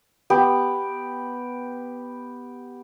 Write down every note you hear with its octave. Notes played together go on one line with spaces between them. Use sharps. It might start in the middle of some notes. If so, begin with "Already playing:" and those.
B3 G4